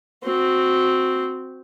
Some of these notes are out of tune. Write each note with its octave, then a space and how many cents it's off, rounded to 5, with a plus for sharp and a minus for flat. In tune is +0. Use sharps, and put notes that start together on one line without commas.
C4 -5 F#4 -10